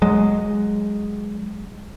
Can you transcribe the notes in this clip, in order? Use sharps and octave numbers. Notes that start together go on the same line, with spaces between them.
F#3 G#3